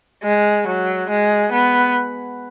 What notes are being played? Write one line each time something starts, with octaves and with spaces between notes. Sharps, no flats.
G#3
F#3
G#3
B3